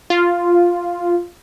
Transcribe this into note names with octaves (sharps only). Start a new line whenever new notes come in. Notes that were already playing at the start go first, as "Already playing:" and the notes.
F4